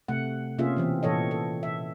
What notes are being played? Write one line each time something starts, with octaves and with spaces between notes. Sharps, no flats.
C3 A3 F#5
C3 A#3 C#4 F4 G#4 E5
B2 E3 C4
A#2 E3 A4 C#5 D#5
A4
E5